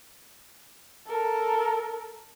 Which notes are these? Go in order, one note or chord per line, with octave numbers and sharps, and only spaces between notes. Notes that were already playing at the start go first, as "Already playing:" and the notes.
A4 A#4